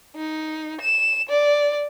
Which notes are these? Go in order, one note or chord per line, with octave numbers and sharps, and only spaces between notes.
D#4
E7
D5